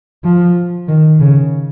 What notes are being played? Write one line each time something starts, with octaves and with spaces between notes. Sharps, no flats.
F3
D#3
C#3